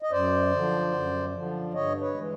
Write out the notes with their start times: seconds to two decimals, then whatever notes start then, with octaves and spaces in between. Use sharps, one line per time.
0.02 D#5
0.11 F#2 C5 D5
0.52 D3 F3
0.93 F#2
1.33 D3 F3
1.73 G2 C#5 D#5
2.01 B4 C#5
2.14 E3 G#3